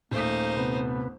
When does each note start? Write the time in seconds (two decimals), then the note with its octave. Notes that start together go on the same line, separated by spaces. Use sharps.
0.11 D#1 A3 A#3 D#4 C5
0.57 C3 B3 B4